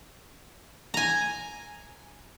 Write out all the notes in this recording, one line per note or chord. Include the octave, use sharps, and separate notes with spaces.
G#5 A#5